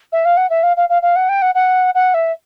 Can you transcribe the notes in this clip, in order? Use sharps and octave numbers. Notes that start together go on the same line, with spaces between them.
E5
F5
F#5
E5
F5
F5
F5
F5
F#5
G5
F#5
F#5
F#5
E5